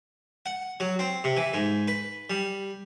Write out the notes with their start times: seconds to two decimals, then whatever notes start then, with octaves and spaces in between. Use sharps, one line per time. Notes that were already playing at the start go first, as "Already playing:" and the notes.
0.46 F#5
0.80 F#3
0.99 C4
1.24 C3
1.37 E3
1.54 G#2
1.88 B4
2.30 G3